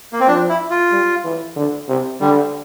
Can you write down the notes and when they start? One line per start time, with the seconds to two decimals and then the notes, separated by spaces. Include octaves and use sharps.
0.13 A#3
0.20 C4
0.27 F3 D4
0.49 E4
0.70 F4
0.92 G3
1.24 E3
1.56 D3
1.89 C3
2.21 D3 G3